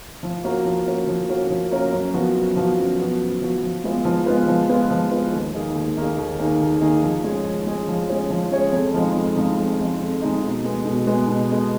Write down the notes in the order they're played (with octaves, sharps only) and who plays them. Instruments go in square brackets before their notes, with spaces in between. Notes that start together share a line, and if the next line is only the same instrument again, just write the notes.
[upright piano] F3
A#3 C#4 F#4 A#4
F3
A#3 C#4 F#4 A#4
F3
A#3 C#4 F#4 A#4
F3
A#3 C#4 F#4 A#4
F#2
F3 B3 F#4
F#2
F3 B3 F#4
F#2
F3 B3 F#4
F#2
F3 B3 F#4
F3
G#3 B3 F4 B4
F3
G#3 B3 F4 B4
F3
G#3 B3 F4 B4
F3
G#3 B3 F4 B4
D#2
D#3 A#3 D#4 G#4
D#2
D#3 A#3 D#4 G#4
D#2
D#3 A#3 D#4 G#4
D#2
D#3 A#3 D#4 G#4
F3
G#3 C#4 G#4 C#5
F3
G#3 C#4 G#4 C#5
F3
G#3 C#4 G#4 C#5
F3
G#3 C#4 G#4 C#5
F2
F3 G#3 D#4
F2
F3 G#3 D#4
F2
F3 G#3 D#4
F2
F3 G#3 D#4
B2
G#3 B3
B2
G#3 B3
B2
G#3 B3